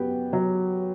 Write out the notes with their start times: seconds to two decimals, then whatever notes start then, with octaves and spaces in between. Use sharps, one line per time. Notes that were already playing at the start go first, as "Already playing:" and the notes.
Already playing: F#2 B3 G4 G5
0.33 F#3